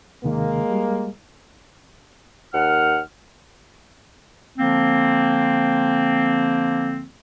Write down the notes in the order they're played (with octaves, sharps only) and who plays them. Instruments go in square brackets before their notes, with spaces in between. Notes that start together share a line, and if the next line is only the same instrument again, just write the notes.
[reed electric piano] D#2 C3 D#3 [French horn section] G#3 A#3
[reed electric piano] G3
[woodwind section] D#2 F#5 F6
D3 F3 A#3 C4